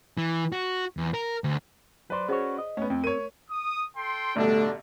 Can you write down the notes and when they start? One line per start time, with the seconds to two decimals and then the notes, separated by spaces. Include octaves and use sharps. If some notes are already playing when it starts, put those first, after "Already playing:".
0.18 E3
0.52 F#4
0.97 E2
1.14 A#4
1.44 D2
2.10 F#3 B4 C5 D5
2.28 C#4 F#4 G#4 C5 C#5
2.58 D#5
2.77 A3 B3 C#4
2.90 F2 C4
3.04 A#4 C#5 D#7
3.50 D#6
3.96 A4 G5 C6
4.36 A1 B2 D3 G3 A3 D4